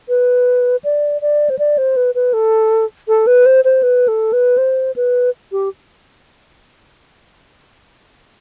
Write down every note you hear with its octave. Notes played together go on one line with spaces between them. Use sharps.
B4
D5
D5
C5
D5
C5
B4
B4
A4
A4
B4
C5
C5
B4
A4
B4
C5
B4
G4